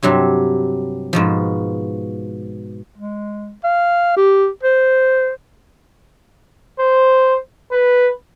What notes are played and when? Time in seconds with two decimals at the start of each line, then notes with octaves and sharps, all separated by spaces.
0.03 G2 C3 F#3 G3
1.13 G#2 B2 F3
2.97 G#3
3.64 F5
4.17 G4
4.63 C5
6.80 C5
7.71 B4